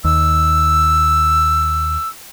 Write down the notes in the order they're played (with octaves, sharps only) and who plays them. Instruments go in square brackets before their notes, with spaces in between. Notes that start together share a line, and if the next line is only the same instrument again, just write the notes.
[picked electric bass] D#2 [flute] E6